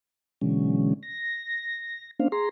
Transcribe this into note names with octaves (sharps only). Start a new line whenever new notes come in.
B2 D3 E3 F#3 G#3 C#4
A#6
A#3 C#4 D4 C5 F5
G#4 A#5 C6